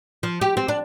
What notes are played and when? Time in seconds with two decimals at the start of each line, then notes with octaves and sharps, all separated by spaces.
0.23 F3
0.41 G4
0.57 C4
0.68 D4